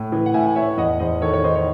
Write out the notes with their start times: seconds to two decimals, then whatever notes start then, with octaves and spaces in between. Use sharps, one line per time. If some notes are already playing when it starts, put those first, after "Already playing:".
Already playing: A2
0.12 E3
0.26 F#5
0.34 A2 E5 G#5
0.56 A2 C#5 E5
0.77 E2 D#5 F#5
0.99 E2 C5 D#5
1.22 D#3 A4 C#5
1.33 C#5
1.44 D#3 C5 D#5
1.55 C#5